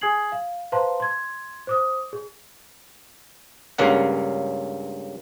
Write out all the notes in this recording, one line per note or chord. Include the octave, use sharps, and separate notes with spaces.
G#4 G#5 D#6 G#6 C7 F#7
F5
B4 C5 F5 A5 A#5 C6
C6 G#6
C5 D6 D#6
G#4
C#2 G2 C#3 A#3 F#5